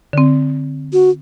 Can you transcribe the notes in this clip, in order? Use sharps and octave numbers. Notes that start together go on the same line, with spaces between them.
D3 C4
F#4